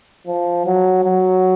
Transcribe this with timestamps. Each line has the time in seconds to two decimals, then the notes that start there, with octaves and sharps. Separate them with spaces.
0.26 F3
0.66 F#3
1.05 F#3